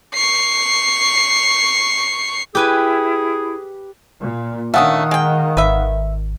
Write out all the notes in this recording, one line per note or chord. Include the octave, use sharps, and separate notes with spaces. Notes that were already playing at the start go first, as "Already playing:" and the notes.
C#6 C7
E4 G4 G#4 B4 G#5
A#2
D#3 A3 C#4 D4 F5 F#5 D#6
G#3 G5
G#1 B4 E5